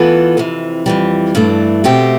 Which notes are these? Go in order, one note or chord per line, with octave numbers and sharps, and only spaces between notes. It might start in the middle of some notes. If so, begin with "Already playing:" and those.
Already playing: E3 B3 F4 A4
F2 C3 E3
F2 E3 G3
G2 E3 A3 D4
B2 A3 C4 G4